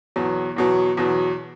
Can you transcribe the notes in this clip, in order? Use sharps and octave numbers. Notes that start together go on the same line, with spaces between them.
E2 B2 F#3
E2 B2 F#3
E2 B2 F#3